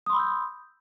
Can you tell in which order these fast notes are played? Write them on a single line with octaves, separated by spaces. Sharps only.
D#6 C6 B5 E6 G6